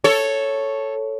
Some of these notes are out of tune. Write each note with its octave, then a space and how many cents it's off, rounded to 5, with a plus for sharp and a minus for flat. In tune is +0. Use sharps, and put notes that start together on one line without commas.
A4 +0 C#5 +0